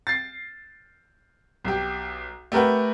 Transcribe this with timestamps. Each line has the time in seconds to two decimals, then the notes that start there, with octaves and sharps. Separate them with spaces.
0.07 A6 C7
1.64 B1 G4
2.52 A3 G4 A#4 B4 F#5